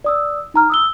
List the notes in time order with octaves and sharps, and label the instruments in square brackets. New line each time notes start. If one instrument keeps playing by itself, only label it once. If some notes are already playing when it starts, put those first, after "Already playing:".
[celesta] D5 D#6 E6
D#4 A#5 F6
D#6 E6 G7